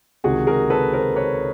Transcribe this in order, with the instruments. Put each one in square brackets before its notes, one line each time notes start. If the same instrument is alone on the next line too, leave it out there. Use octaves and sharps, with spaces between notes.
[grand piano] C#2 C3 D#3 F#4 G#4
G#4 A#4
A4 B4
A#4 C5
B4 C#5